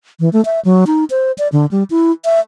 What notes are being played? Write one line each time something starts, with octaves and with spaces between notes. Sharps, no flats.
E3
A3
E5
F#3
D#4
C5
D5
D3
G3
E4
E5